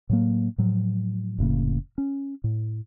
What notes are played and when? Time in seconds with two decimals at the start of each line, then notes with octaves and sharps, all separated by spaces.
0.09 A2 F#3 A#3
0.58 A2 F3 F#3
1.38 F1 A2 C#3 A#3
1.98 C#4
2.44 A2